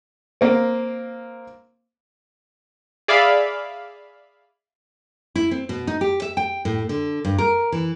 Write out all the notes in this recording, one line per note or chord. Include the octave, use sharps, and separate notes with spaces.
A#3 C4
G#4 D5 E5 F5 B5
E4
C4
B2
D#4
G4
E5
G5
A2
D3
G2
A#4
E3